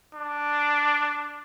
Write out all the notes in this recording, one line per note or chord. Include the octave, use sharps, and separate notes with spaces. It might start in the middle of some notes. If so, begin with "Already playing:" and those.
D4